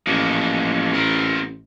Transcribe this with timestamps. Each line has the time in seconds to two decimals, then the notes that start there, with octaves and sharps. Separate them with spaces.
0.07 A1 F3 G#3 A#3
0.94 C4 A#4